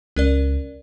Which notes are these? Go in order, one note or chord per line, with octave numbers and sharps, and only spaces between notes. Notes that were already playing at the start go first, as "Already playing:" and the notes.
C#2 C#4 A#4 D5